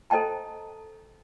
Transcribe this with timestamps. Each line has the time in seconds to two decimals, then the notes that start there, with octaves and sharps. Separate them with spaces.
0.10 A4 C5 D#5 G5 A5 A#5